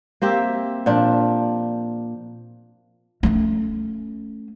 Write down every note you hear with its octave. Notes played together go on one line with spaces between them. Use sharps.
A#3 C4 G4 E5
A#2 F3 D4
A3 C#4